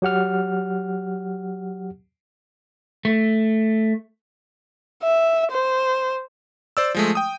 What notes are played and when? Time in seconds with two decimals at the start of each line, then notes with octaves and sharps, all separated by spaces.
0.02 F#3 G4 F#5 F6
3.05 A3
5.03 E5
5.52 C5
6.77 C5 D5 E6
6.94 F3 G#3 A3
7.15 G5 D#6